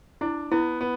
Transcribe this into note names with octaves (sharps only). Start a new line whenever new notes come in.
D4 E4
B3 E4
B3